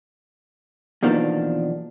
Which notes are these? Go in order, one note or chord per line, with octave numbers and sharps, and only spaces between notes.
E2 B2 D#3 F3 A#3 D4